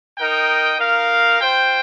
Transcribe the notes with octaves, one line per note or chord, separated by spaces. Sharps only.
D#4 A#4 D#5 G5
D#4 A#4 F5
F4 C5 G5